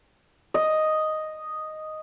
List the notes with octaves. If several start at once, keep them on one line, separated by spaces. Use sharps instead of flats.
D#5